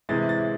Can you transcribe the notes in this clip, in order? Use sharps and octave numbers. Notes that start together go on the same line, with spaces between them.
C3 E3 G#3 A6
A6